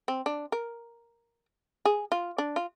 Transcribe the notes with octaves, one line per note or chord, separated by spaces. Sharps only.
C4
D4
A#4
G#4
F4
D4
F4